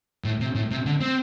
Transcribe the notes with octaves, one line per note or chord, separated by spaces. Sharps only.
A2
C3
A2
C3
D3
C4